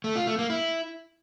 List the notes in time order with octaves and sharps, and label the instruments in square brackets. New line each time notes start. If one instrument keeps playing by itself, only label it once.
[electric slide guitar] A3
F4
A3
A#3
E4